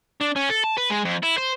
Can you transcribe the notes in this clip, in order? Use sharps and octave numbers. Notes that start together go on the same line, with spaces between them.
D4
C#4
A4
A5
B4
G#3
F2
E4
C5